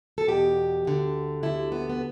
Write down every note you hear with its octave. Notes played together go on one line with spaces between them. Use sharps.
A4
E2 B2 G4
D2 D3
D2 D3 E4
B3
B3